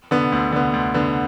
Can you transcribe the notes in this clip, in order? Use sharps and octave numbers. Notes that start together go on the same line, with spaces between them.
D3 B3
D2
D3 B3
D2
D3 B3